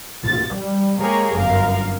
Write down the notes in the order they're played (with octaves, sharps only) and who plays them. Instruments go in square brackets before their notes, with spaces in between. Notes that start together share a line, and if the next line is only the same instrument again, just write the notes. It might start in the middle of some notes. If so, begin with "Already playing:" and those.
[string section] A6
G3
G#3 A#3 G4 G#4 A#4 C#5
G1 F#2 A#4 F5